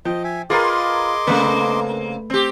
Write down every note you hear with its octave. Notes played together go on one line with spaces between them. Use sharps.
F3 D#5 G5
E5 G#5
F4 G#4 A#4 B4 D#5 C6 D6
C#3 A3 A#3 C4 B4
C4 G4